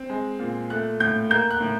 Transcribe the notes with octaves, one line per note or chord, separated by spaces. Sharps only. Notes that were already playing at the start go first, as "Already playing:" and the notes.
Already playing: C4
G#3
A#2
A3 F#6
A2 G6
A#3 G6
F#6
A2